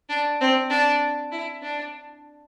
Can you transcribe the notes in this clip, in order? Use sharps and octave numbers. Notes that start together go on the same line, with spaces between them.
D4
C4
D4
E4
D4